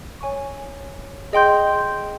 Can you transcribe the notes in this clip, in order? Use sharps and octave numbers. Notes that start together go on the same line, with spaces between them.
C#5 G#5 C#6
G#4 D#5 G5 C6 G6